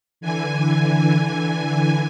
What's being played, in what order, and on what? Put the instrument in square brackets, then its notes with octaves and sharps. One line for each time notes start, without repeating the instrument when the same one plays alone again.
[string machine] D3 E3 G#5